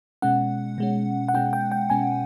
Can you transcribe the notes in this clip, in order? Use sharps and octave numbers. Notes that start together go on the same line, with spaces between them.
B2 G#3 C#4 F#5
B2 G#3 C#4
F#5
B2 G#3 C#4 G5
G5
G5
B2 G#3 C#4 G#5